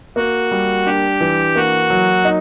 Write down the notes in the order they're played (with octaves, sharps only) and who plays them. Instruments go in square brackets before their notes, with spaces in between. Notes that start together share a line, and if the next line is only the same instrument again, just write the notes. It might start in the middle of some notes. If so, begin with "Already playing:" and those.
[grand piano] A#3 [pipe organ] F#4
[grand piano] G3
[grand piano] D4 [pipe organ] G4
[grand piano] E3
[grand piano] A#3 [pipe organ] F#4
[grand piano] F#3
D#4